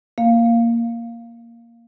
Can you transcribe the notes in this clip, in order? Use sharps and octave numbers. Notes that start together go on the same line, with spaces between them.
A#3 F5